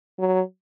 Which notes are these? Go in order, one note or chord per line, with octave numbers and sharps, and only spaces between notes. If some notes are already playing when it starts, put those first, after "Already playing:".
F#3